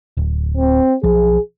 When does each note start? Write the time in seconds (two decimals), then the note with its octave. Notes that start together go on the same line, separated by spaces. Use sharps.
0.17 D1
0.57 C4
1.04 B1 F3 G#4